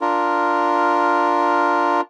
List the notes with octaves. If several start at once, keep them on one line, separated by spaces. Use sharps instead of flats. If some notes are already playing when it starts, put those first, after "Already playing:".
D4 F4 A#4